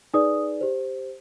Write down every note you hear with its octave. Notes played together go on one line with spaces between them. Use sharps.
D#4 G#4 B4 D5 D#6
G4 C5